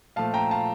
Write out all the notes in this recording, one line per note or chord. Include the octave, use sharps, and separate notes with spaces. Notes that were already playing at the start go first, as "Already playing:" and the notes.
A#2 F3 A3 F5 A5
G5 A#5
F5 A5